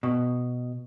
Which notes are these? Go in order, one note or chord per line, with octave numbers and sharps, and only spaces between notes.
B2